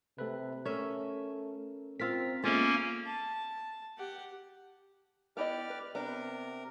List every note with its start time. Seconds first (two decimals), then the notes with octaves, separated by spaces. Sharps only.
0.18 C3 A3 A4 B4
0.66 A3 C#4 A#4 E5
2.00 C4 F4 A#4 E6 F6 B6
2.44 G#3 A#3 B3 C#4 F4 A4 E5 F5
3.06 A5
3.98 G4 F#5
5.37 B3 E4 G4 D5 D#5 F6
5.70 B4
5.95 C3 B3 D4 A#4